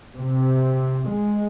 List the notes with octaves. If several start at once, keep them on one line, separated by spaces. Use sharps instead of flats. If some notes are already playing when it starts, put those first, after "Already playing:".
C3
G#3